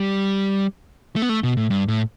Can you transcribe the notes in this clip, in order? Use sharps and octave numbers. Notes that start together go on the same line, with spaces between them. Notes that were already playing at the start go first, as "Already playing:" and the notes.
Already playing: G3
A3
B3
A3
B2
A2
G2
A2